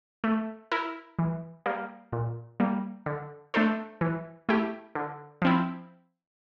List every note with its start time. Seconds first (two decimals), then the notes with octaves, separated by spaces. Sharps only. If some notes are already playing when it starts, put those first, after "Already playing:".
0.24 A3
0.72 E4 A#4
1.19 E3
1.66 G3 A#3
2.12 A#2
2.60 G3 A#3
3.06 D3
3.54 A3 D4 A4 C5
4.01 E3
4.49 A3 E4 G4
4.95 D3
5.42 F3 C4 E4